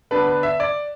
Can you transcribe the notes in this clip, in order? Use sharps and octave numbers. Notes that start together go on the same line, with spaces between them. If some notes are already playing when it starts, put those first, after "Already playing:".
D3 B3 D4 B4
B4
E5
D5